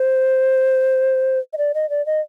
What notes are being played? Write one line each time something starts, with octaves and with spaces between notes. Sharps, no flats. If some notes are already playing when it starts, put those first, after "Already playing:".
Already playing: C5
D#5
D5
D#5
D5
D#5